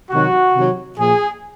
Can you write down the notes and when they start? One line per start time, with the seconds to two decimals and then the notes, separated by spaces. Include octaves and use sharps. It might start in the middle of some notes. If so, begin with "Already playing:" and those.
0.11 C3 D#3 F#3 F#4
0.55 C3 D#3 F#3
0.98 A#2 F3 G#4